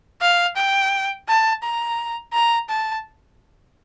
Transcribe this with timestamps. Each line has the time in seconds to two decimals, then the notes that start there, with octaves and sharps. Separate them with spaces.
0.21 F5
0.57 G5
1.28 A5
1.63 A#5
2.33 A#5
2.69 A5